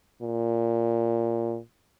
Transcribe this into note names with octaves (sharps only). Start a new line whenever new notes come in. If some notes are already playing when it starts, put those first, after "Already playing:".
A#2